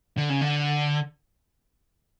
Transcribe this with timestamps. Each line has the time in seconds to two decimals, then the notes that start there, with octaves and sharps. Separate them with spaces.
0.17 D3
0.30 C#3
0.41 D3